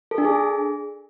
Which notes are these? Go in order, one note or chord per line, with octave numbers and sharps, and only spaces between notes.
A4
D4
G#4